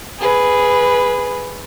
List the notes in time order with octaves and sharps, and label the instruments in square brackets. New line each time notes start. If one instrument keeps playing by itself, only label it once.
[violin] G#4 B4